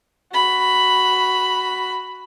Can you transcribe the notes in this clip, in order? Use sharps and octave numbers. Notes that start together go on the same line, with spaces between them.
F#4 B5